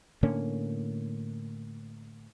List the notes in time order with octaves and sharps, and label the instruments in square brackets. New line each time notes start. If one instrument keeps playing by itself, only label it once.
[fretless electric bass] A2 D3 A#3 C#4